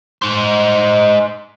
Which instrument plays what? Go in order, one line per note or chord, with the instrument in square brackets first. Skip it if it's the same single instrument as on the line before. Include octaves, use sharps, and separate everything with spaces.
[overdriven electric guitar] D#4 C5